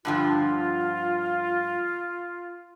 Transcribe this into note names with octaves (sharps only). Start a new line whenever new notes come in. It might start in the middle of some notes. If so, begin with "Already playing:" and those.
G2 D3 F3 F4